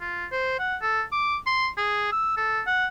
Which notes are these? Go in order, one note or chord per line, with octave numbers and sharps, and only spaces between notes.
F4
C5
F#5
A4
D6
C6
G#4
E6
A4
F#5